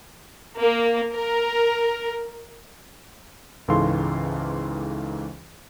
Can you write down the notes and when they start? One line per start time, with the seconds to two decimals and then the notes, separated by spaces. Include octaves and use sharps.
0.56 A#3
1.15 A#4
3.68 C#2 G#2 E3 A4 F5 C6